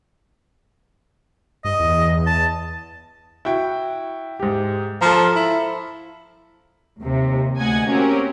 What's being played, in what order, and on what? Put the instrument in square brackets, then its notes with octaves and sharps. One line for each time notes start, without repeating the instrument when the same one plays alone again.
[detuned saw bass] G2 [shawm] D#5
[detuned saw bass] E2
[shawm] A5
[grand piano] E4 F#4 G5
G#2 G4
[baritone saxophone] F3 [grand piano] A4 A5 A#5
[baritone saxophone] E4
[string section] D#2 C3
D2 D#5 F#5 G#5 G#6
A#3 C4 C#4 F#4 G4 A#4